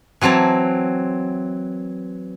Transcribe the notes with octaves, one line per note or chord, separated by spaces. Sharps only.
E3 F#3 C4 A5 A#5